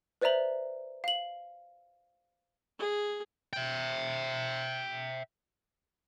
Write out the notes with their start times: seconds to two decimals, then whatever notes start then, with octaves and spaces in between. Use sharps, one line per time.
0.21 B4 C5 D5 E5 A#5 F#7
1.04 F5 F#7
2.79 G#4
3.53 E5 G5